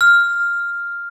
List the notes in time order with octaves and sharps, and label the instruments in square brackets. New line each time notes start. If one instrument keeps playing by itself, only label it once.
[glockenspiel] F6